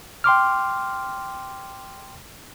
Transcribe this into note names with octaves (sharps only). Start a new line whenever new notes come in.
G5 C6 D6 F6